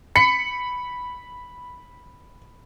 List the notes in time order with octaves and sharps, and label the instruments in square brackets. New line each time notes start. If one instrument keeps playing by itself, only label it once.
[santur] B5 [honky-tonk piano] C#7